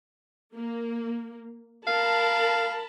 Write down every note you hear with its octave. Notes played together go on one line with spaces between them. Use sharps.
A#3
A#4 F5 A5 B5